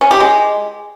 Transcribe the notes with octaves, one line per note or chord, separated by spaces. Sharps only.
C#4
G4
G#3